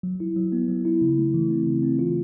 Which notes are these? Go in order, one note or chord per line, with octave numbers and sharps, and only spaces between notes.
F#3
E4
F#3
B3
F#3
E4
C#3
A3
E3
C4
C#3
C4
F4